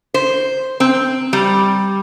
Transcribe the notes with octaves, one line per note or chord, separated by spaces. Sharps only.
C5
C4
G3